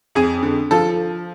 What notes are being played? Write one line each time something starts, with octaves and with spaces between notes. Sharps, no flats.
F2 G#4
D3
F3 A4